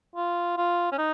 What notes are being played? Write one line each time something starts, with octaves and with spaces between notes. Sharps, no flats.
F4
F4
C#4
D#4